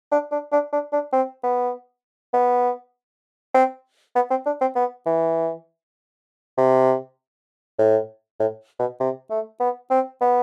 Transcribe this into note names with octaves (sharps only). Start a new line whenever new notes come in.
D4
D4
D4
D4
D4
C4
B3
B3
C4
B3
C4
D4
C4
B3
E3
C3
A2
A2
B2
C3
A3
B3
C4
B3